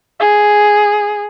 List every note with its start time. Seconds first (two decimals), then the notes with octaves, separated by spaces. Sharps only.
0.20 G#4